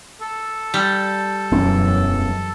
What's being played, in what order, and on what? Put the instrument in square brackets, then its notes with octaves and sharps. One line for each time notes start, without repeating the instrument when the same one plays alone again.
[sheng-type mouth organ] A4
[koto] G3
[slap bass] E1 C#4 [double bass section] F#2 E3